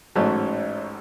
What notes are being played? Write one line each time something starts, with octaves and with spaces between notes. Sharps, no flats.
A1 G#2 F#3 A3 C#4